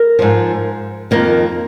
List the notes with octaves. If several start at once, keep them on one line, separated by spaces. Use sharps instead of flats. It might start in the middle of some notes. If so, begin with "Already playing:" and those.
Already playing: A#4
G#2 F3
F2 D#3 A#3